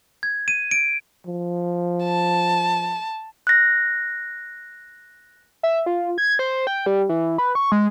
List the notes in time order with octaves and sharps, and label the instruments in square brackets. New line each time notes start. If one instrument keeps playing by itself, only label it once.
[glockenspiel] G#6
D#7
D7
[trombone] F3
[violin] A5
[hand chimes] F#6 A#6
[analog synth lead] E5
F4
G#6
C5
G5
G3
E3
B4
C#6
G#3